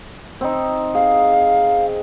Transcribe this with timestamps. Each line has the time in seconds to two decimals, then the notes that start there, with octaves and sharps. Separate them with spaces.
0.41 C4 D#4
0.95 G#4 F5